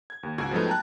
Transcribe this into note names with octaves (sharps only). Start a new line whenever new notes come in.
G#6
D#2
C#2 G#2 F#4 G#6
F3 F#3 G#3 A3 B3 D#4
G5 A5 A#5 F#6